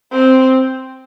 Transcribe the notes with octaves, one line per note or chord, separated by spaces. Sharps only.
C4